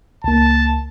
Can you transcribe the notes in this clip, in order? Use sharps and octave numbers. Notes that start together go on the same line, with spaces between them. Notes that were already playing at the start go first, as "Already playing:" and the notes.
C#2 A#3 A5